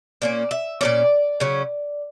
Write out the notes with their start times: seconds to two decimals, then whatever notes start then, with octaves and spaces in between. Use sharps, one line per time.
0.22 A#2 A#3 C#4 D5
0.51 E5
0.81 A#2 A#3 C#4 D5
1.40 C#3 F#3 C#4